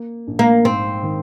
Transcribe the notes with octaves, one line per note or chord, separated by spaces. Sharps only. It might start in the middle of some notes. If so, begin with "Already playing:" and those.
Already playing: A#3
A#1
A#3
G#2 C4
D#3